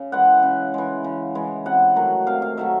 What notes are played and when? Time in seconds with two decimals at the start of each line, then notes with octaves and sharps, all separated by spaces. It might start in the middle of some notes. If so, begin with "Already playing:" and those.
Already playing: C#3
0.12 E3 G#3 F#5
0.43 C#3
0.74 E3 G#3
1.04 C#3
1.35 E3 G#3
1.66 C3 F#5
1.96 D#3 F#3 A3
2.27 C3 F5
2.42 F5
2.57 D#3 F#3 A3 E5